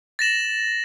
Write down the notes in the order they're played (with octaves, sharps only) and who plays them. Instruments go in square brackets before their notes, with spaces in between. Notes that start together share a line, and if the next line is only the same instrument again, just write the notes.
[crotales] A6 A#6 E7 F#7